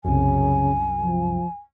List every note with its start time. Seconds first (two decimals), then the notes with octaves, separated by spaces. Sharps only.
0.04 C2 F#2 C#3 G#5
1.01 F3